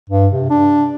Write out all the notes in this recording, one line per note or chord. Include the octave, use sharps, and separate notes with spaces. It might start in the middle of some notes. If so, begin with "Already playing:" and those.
G2
C3
D4